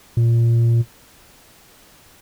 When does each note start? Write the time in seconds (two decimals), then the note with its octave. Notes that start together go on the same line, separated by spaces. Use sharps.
0.17 A#2